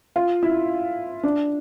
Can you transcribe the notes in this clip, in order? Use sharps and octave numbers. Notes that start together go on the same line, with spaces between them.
F4
E4
D4